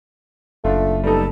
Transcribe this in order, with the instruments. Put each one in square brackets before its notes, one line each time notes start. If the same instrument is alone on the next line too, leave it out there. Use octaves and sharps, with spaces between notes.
[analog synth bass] F#1 [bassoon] A3 [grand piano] D4 F4
[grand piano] G3 B3 D#4 [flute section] A4